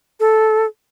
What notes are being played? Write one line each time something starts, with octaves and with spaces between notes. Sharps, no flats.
A4